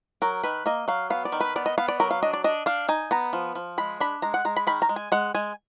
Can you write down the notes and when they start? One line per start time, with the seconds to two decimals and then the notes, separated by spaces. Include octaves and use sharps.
0.22 F#3 A#4
0.43 D#3 B4
0.66 A#3 D#5
0.88 F#3 F5
1.10 B3 F5
1.25 D5
1.32 D#3
1.40 B4
1.56 B3 D5
1.66 D#5
1.78 B3 F5
1.88 D5
2.00 F#3 A#4
2.11 F5
2.22 D4 D#5
2.33 D5
2.44 D4 D#5
2.66 D4 F5
2.88 D#4 G#5
3.11 B3 A#5
3.33 F3
3.55 F3
3.78 G#3 B5
4.00 D4 B5
4.22 G#3 A#5
4.34 F#5
4.45 G#3 A#5
4.56 B5
4.67 D#3 B5
4.82 A#5
4.89 G#3
4.96 G#5
5.12 G#3 F#5
5.34 G#3 G#5